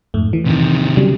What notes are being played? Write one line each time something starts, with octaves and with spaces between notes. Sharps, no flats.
F2 G#2 A3
E3
C3 D#3
C#3 F#3 G3